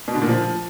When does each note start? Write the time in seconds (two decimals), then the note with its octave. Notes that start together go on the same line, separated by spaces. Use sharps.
0.08 B2
0.15 D3
0.22 A#2
0.29 F3